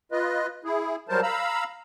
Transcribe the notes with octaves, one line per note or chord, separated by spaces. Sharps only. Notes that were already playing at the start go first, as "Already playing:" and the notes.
F4 B4 D#5
E4 G#4
F#3 G3 A#4 C5 A5
F5 A#5 B5 E6